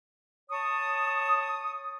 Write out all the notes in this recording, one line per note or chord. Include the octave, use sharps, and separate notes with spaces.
C#5 A5 C#6 D#6